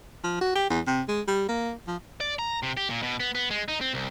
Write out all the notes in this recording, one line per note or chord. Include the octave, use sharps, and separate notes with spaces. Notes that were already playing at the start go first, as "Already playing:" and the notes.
F3
F#4
G4
E2
C3
G#3
G3
A#3
F3
D5
A#5
C3
G4
A#2
B2
B3
B3
G#3
D#4
C4
C2